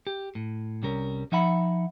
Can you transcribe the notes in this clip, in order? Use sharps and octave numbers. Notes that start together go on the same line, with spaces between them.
G4
A2
C2 G3 C#4 A#4
F3 D#4 E5 F#5 B5